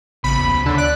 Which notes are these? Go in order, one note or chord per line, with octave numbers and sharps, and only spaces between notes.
A1 C#3 B3 B5
D#2
D2
D3 C#5 A5
D5 F#6